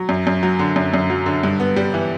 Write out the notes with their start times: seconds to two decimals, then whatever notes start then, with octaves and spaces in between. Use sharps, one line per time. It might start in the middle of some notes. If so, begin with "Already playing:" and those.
Already playing: F#3
0.09 F#2
0.27 F#2
0.43 F#3
0.59 D3
0.76 F#2
0.94 F#2
1.10 F#3
1.26 D3
1.43 G2
1.60 B3
1.76 G3
1.94 E3